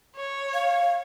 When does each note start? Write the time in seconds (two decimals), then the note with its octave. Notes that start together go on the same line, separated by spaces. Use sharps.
0.16 C#5
0.54 F5